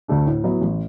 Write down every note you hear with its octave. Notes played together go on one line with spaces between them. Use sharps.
D2 D3 A3 D4
A2
F#3 B3 E4
A1